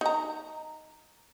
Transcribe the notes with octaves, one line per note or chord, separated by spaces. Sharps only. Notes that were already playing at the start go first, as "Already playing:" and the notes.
D#4 A#5